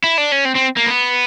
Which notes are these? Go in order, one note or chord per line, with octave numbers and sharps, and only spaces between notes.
E4
D4
C#4
C4
C4
A#3
B3